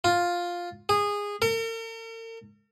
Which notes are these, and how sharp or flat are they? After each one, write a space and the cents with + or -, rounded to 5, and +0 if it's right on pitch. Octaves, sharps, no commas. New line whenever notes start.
F4 +5
G#4 -20
A#4 -45